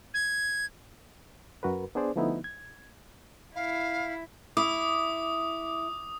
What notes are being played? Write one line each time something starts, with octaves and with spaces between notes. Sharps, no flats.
G#6
F#2 F#4 A#4 B4
B3 D4 G#4 C5 D5
D3 F3 A3 B3 D#4 E4
G#6
E4 F5
E4 D6 D#6